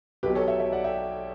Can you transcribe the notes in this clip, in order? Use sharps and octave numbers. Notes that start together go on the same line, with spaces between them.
B1 B2 F#3 G4 B4
A4 C#5
C#5 E5
C#5 E5
D5 F#5
E5 G5